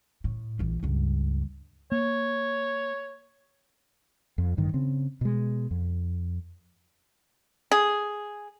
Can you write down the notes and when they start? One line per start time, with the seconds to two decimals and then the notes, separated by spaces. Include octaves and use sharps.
0.24 A2
0.59 A#1 E3
0.83 C#2 G2
1.92 A#3 C#5
4.38 F2
4.57 A1 G2 D#3
4.74 C#3 C4
5.21 B2 G#3
5.71 F2
7.71 G#4